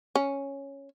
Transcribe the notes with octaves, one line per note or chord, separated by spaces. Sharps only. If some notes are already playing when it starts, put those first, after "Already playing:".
C#4